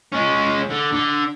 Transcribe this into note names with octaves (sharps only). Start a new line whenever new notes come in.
G#3 C#4
D3
D3